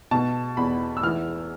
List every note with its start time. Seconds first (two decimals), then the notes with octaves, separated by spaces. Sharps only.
0.11 B2 A5
0.57 E2 B5
0.97 E6
1.03 E3 F6